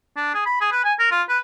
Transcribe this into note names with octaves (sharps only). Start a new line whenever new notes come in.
D4
G#4
B5
G#4
B4
G#5
A#4
F4
B4